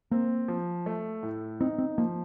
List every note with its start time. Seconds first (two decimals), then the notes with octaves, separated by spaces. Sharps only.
0.11 A#3 C4
0.48 F3
0.86 A3
1.23 A2
1.61 C4 D#4
1.79 C4
1.98 F3 A#3